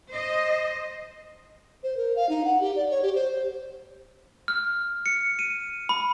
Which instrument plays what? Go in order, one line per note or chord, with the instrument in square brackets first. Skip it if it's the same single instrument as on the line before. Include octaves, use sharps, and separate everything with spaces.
[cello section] C5 D#5
[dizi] C5
A#4
F5
D#4
F#5
G4
D5
C#5
G4
C5
[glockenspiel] F6
C#7
D#7
B5